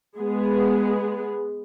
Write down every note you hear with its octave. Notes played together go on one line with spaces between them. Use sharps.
G#3 B3 G#4